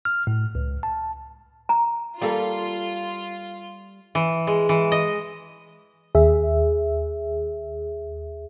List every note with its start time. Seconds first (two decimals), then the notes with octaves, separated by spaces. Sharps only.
0.05 F6
0.27 A2
0.55 C#2
0.83 A5
1.69 A#5
2.21 G3 A#3 F4 A4
4.15 E3
4.47 G#3
4.69 E3
4.92 D#5
6.15 D#2 G#4 E5